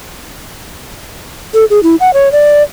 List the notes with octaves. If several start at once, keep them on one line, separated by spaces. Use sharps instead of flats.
A4
G#4
E4
F#5
C#5
D5